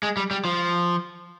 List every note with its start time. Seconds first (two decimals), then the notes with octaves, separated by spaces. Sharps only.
0.03 G#3
0.17 G3
0.31 G3
0.45 F3